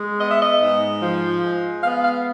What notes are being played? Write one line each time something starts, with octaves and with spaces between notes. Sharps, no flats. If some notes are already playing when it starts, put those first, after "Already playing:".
Already playing: G#3
B3 D#5
E5
D#5
G#2
F3
G#3
B3 F5
F5